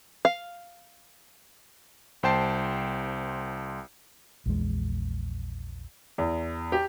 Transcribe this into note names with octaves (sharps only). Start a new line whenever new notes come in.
F5
C2 C5 G5 A5 C7
A#1 E2 G#3
E2
G4